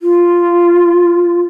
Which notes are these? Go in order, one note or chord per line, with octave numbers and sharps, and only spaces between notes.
F4